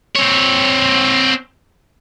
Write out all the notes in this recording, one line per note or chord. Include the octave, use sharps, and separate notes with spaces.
C4 C#5